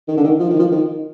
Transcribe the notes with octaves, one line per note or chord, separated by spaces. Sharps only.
D#3
D3
D#3
F3
D#3
F3
D#3